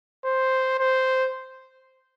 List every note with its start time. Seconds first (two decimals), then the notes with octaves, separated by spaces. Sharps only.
0.25 C5
0.79 C5